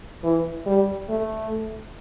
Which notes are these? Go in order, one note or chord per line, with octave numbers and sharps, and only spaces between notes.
E3
G3
A3